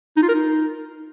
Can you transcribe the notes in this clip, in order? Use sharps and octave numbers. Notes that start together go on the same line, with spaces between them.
D#4
F4
A#4
D#4